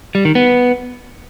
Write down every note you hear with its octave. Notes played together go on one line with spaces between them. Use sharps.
G3
D#3
B3